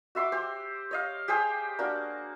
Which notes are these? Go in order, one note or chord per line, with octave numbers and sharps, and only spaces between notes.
F#4 E5 C6 D6
G4 C5
C#5 D#5 F5
G4 G#4 C5 G5
A#3 D4 F#4